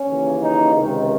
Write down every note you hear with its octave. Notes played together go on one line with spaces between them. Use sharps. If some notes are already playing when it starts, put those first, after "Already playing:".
Already playing: C#4
D#2 C#3 E3
D#4
C#2 C3 D#3